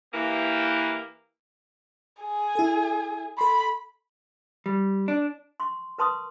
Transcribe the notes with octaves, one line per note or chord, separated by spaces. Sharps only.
E3 A#3 G4
G#4
E4 A4
A4 B5 C6
G3
D4
C6 C#6
A#4 B4 A5 C6 C#6 D#6